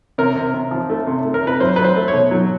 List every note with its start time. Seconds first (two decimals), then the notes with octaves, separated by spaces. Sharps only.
0.18 C3 A#4
0.36 C3
0.54 C3
0.71 F3
0.90 A3
1.07 C3
1.25 A3
1.34 A#4
1.43 C3 B4
1.60 F#3 C5
1.76 F#3 B4
1.84 C5
1.96 A3
2.08 C#5
2.14 B2
2.31 F#3